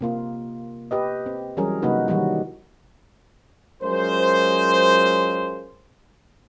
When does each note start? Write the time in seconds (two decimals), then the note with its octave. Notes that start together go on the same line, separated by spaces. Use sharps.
0.01 C3 A#3 F4
0.91 G4 B4 D#5
1.26 C4
1.57 E3 F#3 G3 C#4 G#4 A#4
1.82 C3 F#3 A#3 D#4 F#4 B4
2.08 D#3 E3 F#3 G3 F#4
3.83 F#3 G#3 C#4 F4 A#4 C5